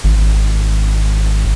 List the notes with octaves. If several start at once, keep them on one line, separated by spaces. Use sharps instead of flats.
G#1